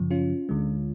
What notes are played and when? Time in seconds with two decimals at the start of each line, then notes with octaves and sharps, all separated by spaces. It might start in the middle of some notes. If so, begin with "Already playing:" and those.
Already playing: F#2 C#3 F3
0.11 C#4 F4
0.49 D2 D3 G#3